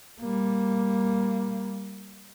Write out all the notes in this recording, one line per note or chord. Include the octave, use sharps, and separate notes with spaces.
G3 A#3